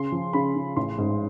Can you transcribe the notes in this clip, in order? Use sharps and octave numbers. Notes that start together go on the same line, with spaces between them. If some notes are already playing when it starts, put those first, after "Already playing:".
Already playing: C#3 C6
F3
C#3 B5
C#3
A1 C6
G#2